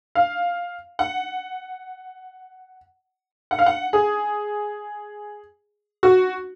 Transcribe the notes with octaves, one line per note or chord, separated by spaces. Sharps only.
F5
F#5
F#5
F5
F#5
G#4
F#4